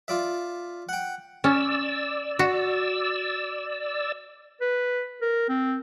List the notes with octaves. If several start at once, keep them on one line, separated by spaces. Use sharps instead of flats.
F4 D5 E5
F#5 G5
C#4 D5 E6
F#4
B4
A#4
C4